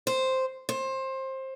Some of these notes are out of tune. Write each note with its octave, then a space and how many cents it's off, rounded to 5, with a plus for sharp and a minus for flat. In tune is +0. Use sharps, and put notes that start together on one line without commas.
C5 +0
C5 +20